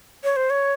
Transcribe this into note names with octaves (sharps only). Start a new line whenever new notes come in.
C#5
C5
C#5